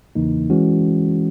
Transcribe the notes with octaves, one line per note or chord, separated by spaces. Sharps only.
E2 C#3 E3 A#3 D#4
E3 G#3 C#4 F#4